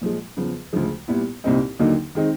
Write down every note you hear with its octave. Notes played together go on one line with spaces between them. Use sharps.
A#2 F3 G#3
E2 C#3 F3
D2 C#3 F3 G#3
A#2 G3 B3 E4
C2 A#2 G3 C4 D#4
D#2 D3 F#3 A#3 D#4
D#3 G#3 C4 D#4